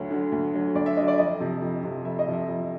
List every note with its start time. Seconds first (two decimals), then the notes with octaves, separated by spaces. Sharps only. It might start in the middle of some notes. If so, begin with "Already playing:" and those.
Already playing: D2 D3 F#3 C#5
0.10 D3 F#3
0.32 D2
0.54 D3 F#3
0.75 D2 D5
0.86 E5
0.97 D3 F#3 D#5
1.08 D5
1.18 F2 D#5
1.40 C3 F3
1.61 F2
1.83 C3 F3
2.05 F2 E5
2.19 D#5
2.27 C3 F3
2.34 E5
2.48 F2